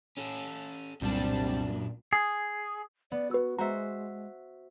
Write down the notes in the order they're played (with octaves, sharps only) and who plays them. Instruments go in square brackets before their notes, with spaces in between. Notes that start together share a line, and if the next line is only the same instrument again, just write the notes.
[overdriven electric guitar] C#4 A4
[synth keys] C2 G3 A5 [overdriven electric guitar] F#2 D4 [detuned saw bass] A#2 [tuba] C4
[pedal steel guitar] G#4
[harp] B3 [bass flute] D5
[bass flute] F#4 [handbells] B4 E6
[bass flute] G#3 [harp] F#4 C5 E5 [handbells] A#5